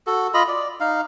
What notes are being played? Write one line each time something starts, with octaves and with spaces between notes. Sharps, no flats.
F#4 A4
F4 D#5 B5
D5
D#4 F5